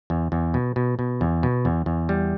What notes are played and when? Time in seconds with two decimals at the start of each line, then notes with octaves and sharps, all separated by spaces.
0.10 E2
0.32 E2
0.54 B2
0.76 B2
0.99 B2
1.21 E2
1.43 B2
1.65 E2
1.86 E2
2.09 G3